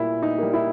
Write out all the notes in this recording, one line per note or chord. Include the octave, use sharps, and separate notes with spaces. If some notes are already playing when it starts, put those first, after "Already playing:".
Already playing: A#2 G3 A#3 E4
D#4
G3 A#3
E4